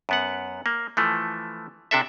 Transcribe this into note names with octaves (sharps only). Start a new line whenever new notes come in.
F#2 B3 F#5
A#3
E3 F3 A3
C3 D4 A4 E5